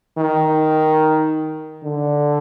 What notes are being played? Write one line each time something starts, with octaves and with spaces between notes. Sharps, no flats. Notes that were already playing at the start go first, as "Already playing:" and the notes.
D#3
D3